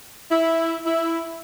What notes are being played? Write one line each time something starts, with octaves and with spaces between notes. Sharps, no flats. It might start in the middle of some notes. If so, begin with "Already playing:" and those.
E4
E4